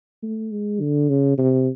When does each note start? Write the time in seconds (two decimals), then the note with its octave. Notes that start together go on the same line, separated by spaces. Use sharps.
0.23 A3
0.51 G#3
0.81 D3
1.10 C#3
1.38 C3